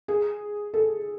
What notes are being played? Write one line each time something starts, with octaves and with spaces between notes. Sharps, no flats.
G#4
A4